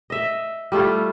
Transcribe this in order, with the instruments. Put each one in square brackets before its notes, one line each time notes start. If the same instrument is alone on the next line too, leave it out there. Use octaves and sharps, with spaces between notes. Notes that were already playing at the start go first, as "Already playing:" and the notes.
[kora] D#5 E5
G3 A3 E4 F4